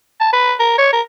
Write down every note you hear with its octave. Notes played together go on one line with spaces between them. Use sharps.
A5
B4
A#4
C#5
A#4